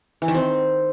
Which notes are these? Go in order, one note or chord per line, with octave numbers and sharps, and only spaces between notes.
E3
D#3
C4